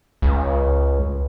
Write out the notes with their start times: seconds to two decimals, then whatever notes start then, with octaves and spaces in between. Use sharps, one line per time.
0.22 C#2